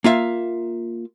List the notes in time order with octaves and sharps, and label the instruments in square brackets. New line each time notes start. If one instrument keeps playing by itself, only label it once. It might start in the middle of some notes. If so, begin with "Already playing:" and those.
[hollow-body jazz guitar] A#3 F4 E5 F5